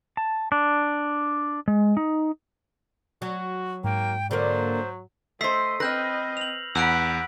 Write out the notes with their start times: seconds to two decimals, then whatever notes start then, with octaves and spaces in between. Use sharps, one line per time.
0.17 A5
0.52 D4
1.68 G#3
1.97 D#4
3.22 F#3 F#4
3.84 G#2 A#3 G5
4.31 D3 F#3 A#3 A#4 C5
5.41 A3 C5 D#5 E6 B6 C7
5.80 C4 B4 D#5 F6 G6 A#6
6.37 F7 F#7
6.75 E2 F#5 B5 E6 F#6 D7